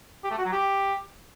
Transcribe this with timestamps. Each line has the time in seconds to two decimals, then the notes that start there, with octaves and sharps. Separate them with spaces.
0.24 G4
0.31 A3
0.38 F#4
0.45 F#3
0.52 G4